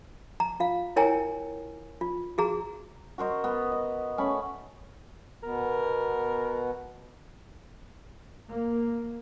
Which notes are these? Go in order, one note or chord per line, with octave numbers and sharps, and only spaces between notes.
A#5
F4 F5
E4 A#4 C#5 G5 G#5 A#5
F4
F#4 G#4 A#5
F#4 A#4 C5 D#5
B3
D#5
A3 C#4 G#5 B5
B2 B3 A#4
A#3